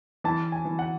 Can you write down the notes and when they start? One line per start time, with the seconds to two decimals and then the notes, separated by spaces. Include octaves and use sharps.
0.24 E3 A5
0.52 G#5
0.65 E3
0.79 F#5